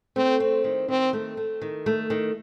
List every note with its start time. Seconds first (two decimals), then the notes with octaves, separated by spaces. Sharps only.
0.16 A3 C4
0.40 C4
0.64 D#3
0.88 D#3 C4
1.13 A3
1.37 A3
1.61 D#3
1.86 A3
2.10 D#3